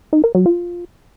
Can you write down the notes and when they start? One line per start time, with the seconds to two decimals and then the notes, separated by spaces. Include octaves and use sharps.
0.13 D#4
0.24 A#4
0.35 F#3
0.46 F4